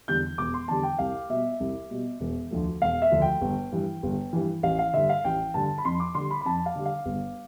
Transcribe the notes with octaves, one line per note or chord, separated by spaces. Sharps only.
E2 D3 G3 G6
E1 D6
C6
E2 D3 G3 A5
G5
C2 F5
B2 G3 E5
C2
B2 G3
E1
D2 D3 F3 A3
E1 F5
E5
D2 D3 F3 A3
G5
G1
G2 E3
G1
G2 E3
A1 F5
F5
G2 D3 E5
F5
A1 G5
G2 D3 A5
B5
F2 C6
D6
D3 G3 C6
B5
B5
F2 A5
F5
D3 G3
F5
G1